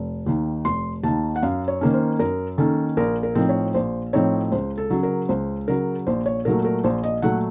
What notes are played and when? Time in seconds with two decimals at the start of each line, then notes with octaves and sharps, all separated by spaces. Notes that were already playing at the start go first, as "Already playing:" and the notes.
Already playing: F1
0.26 D#2 D#3
0.65 F1 C6
1.03 D#2 D#3 A5
1.36 F#5
1.43 F#2 F5
1.68 C#5
1.81 D#3 A#3 C#4
1.94 C5
2.19 F#2 A#4
2.58 D#3 A#3 C#4 A4
2.97 A#1 A#4
3.23 A#4
3.35 A2 F3 C4 D#4
3.49 C#5
3.74 A#1 C5
4.13 A2 F3 C4 D#4 C#5
4.52 C#2 C5
4.78 A4
4.90 C#3 F#3
5.03 A#4
5.29 C#2 C5
5.68 C#3 F#3 A#4
6.07 A#1 C5
6.26 C#5
6.45 A#2 F#3 A3 A#4
6.65 A#4
6.84 A#1 C5
7.03 D#5
7.22 A#2 F#3 A3 F#5